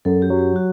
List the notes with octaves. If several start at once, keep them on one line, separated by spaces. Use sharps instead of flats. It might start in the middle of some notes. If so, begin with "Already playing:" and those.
F#2 A4
G4
F#3
G4
F#4